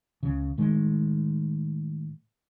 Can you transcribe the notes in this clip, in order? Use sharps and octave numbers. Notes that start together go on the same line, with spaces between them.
C#2 C#3
A2 D#3 G#3